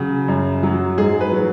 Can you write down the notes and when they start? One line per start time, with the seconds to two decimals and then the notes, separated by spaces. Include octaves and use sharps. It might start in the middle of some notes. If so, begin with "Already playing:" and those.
Already playing: C#3 F#3
0.28 F#2
0.63 F#3
0.97 G#2 G#4
1.21 B4
1.32 F#3